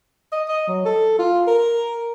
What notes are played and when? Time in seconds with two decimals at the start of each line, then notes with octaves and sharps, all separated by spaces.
0.32 D#5
0.48 D#5
0.67 F#3
0.85 A4
1.19 F4
1.47 A#4